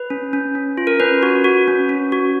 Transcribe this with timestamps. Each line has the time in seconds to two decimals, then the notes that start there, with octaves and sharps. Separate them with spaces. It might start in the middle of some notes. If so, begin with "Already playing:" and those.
Already playing: B4
0.10 C#4
0.33 C#4
0.55 C#4
0.77 F4
0.87 A#4
1.00 C#4 B4
1.23 F#4
1.44 F#4
1.68 C#4
1.89 C#4
2.12 F#4